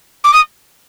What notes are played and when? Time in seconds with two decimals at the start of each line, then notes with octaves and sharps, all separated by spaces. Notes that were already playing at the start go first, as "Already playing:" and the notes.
0.24 D6
0.33 D#6